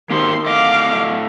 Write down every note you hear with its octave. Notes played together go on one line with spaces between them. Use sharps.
D#3 A#3 G4 C5 C6
A2 D#5 F5 D6